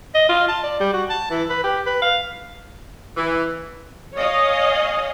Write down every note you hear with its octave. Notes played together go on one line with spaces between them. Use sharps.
D#5
F4
A5
D5
G3
F#4
A5
E3
B4
G4
B4
F5
E3
C#5 D#5 F5 G#5